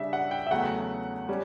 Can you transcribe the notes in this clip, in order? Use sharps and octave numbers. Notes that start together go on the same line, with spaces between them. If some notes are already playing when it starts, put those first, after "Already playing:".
Already playing: C#3 G3 D4 E5
F#5
G5
E5
E2 C#3 F#3 A3 F#5
G3 C#4